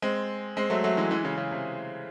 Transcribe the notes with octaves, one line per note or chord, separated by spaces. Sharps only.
G#3 C4
G#3 C4
F#3 A3
F#3 A3
E3 G#3
E3 G#3
C#3 E3
C#3
C3